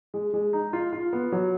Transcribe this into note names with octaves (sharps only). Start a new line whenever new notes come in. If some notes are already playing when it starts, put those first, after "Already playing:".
G#3
G#3
D#4
F4
F4
B3
F#3